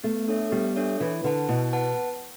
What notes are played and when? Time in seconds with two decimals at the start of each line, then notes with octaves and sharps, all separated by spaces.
0.04 A3 B3
0.28 D4 A4 C#5 E5
0.52 G3 B3
0.76 D4 A4 C#5 E5
1.00 E3 E4
1.24 D3 B4 F#5 A5
1.49 B2 E4
1.73 B4 F#5 A5